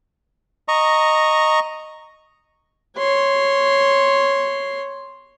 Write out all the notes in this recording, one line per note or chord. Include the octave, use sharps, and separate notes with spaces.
D#5 A#5 C#6
C#5 C6